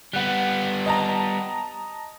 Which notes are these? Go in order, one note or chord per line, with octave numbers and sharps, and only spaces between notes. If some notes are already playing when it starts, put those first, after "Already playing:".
G3 B3 F#5 F#6
D#5 A5 A#5